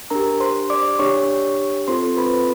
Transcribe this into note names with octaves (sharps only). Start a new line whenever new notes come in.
D4 G4 A#4 A#5
C5 C6
D5 D6
D4 G4 C#5 C#6
C4 F4 A4 C5 C6
B4 B5